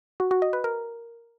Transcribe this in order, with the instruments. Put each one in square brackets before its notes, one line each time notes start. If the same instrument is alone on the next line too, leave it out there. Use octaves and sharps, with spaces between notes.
[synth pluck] F#4
F#4
D#5
B4
A#4